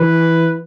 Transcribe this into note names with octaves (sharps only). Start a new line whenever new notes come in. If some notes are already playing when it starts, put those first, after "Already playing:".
Already playing: E3 B4